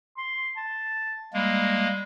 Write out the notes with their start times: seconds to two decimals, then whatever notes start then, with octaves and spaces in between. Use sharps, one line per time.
0.18 C6
0.57 A5
1.33 G3 G#3 A#3